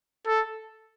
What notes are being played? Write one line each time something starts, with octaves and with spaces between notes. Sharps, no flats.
A4